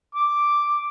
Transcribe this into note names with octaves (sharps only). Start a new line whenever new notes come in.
D6